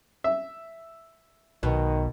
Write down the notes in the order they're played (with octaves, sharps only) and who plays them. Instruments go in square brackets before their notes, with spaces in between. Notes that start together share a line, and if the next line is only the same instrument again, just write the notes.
[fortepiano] E5
[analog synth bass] B1 [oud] B2 [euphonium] D#3